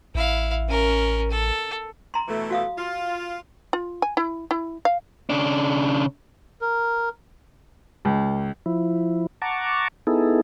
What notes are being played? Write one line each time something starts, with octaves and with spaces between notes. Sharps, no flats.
A1 E4 F5
C#4 A#4
A4
A#5 C6
B2 E3 A3
F#4 F5 D#6
F4
F4
G#5
E4
E4
F5
C#3 D4
A#4
C#2
F3 E4
F#5 A5 A#5 C#6 D6
B3 D#4 E4 G#4 A4